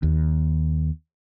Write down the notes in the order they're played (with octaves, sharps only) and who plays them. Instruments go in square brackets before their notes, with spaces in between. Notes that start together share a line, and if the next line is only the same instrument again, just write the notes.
[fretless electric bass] D#2